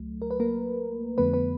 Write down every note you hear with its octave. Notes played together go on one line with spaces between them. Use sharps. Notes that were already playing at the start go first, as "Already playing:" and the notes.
Already playing: C#2 F#3 A3
A#4
B4
A#3 A#4
F2 D3 F3 A3 B3 B4
B3 B4